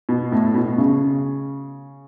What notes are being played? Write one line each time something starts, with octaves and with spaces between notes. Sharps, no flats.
B2
A2
B2
C#3